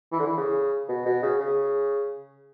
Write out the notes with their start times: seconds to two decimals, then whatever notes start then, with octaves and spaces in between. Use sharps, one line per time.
0.12 E3
0.19 D3
0.27 E3
0.37 C#3
0.89 B2
1.06 B2
1.23 C#3
1.40 C#3